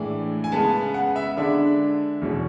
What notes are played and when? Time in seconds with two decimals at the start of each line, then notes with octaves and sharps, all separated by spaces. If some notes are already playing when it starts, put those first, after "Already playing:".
Already playing: A2 E3 G#3 D4 D5
0.44 G#5
0.52 C#3 G#3 B3 A5
0.94 F#5
1.16 E5
1.37 D3 G#3 D4 E5
2.22 E2 B2 G#3 C#4